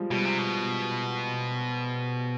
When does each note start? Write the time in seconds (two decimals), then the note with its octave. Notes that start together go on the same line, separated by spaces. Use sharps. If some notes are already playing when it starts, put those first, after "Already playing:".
Already playing: F3 G3 G#3
0.11 B2 G3
0.25 C3
0.38 B2